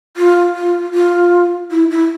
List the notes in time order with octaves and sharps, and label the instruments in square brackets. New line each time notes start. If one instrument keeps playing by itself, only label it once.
[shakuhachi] F4
F4
F4
E4
E4